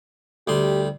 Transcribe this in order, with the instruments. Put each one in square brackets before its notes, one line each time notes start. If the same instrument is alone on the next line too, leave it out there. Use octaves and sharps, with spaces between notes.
[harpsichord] D2 G3 C6 [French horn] G4